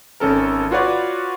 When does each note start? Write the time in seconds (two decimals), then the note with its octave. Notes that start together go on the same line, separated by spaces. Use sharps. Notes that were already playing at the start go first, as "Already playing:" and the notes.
0.20 G#1 C#4 A4 A#4
0.71 F4 F#4 B4 C#5 D5